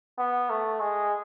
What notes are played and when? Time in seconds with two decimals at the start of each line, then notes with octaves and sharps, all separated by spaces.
0.18 B3
0.50 A3
0.80 G#3